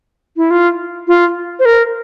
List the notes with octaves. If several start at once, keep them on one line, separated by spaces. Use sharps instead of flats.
E4
F4
F4
C5
A#4